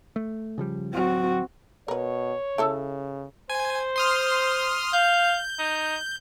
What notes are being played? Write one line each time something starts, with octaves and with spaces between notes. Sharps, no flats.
A3
C#3 F3 G3
D1 F#3 C4 F#4
B2 A#4 B4 C#5
C#3 E4 A4 E5
C5 G#5
C6 D#6 F6
F5 G6
D#4